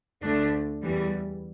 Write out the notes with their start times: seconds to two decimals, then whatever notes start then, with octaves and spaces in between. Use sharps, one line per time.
0.22 D2 D3 A3 D4
0.82 E2 E3 G3